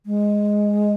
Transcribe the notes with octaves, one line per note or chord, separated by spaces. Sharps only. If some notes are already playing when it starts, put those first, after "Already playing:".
G#3